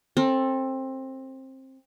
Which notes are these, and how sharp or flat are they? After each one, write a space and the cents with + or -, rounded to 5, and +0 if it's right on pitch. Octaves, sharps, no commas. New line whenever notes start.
C4 +20 A4 +0